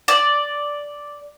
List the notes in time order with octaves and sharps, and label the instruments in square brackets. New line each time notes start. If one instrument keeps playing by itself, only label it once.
[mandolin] D5